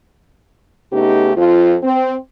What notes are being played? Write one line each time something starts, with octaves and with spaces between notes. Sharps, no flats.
C#3 A3 B3 D#4 G4
F2 F3 F4
C4